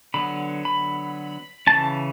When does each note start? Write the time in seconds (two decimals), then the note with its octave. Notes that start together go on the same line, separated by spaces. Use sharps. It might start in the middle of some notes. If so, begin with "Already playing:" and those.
0.14 D3 F#3 B3 B5
0.65 B5
1.67 C#3 E3 A3 C#4 A5